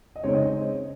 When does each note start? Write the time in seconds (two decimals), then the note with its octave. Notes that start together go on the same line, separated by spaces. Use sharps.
0.16 D#5
0.23 C#3 G#3 C4 D#4 C#5
0.35 D#5